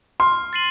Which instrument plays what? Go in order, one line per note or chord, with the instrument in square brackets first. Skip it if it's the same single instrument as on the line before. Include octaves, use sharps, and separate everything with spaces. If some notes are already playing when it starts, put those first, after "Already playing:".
[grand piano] C6 [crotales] F6
[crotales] A6 C7 D#7 F#7